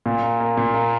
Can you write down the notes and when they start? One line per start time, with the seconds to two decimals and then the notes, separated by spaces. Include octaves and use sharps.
0.06 A#2
0.23 A#3
0.40 A#3
0.57 A#2
0.74 A#3